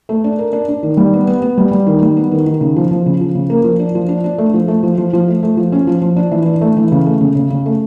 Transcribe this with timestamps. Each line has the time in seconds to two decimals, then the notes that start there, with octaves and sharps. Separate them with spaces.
0.09 A3
0.24 D4
0.39 A#4
0.53 D4
0.68 D4
0.83 D#3
0.97 G3
1.13 B3
1.27 B3
1.42 B3
1.58 G3
1.71 G3
1.87 D#3
2.02 G3
2.17 B3
2.32 D#3
2.47 D#3
2.61 C#3
2.76 F3
2.91 F3
3.06 C#3
3.21 F3
3.35 C#3
3.50 A#3
3.64 F3
3.79 D4
3.95 F3
4.09 D4
4.24 D4
4.38 A3
4.54 F3
4.68 A3
4.83 F3
4.98 F3
5.13 F3
5.28 A3
5.43 A3
5.57 F3
5.72 C#4
5.87 F3
6.02 F3
6.16 D4
6.31 E3
6.46 D4
6.61 A3
6.77 E3
6.92 C#3
7.06 A3
7.21 C#3
7.35 C#3
7.50 C#3
7.66 A3